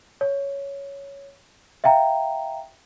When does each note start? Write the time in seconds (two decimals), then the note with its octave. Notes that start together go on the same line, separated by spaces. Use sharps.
0.21 C#5
1.84 E5 F5 G5 A#5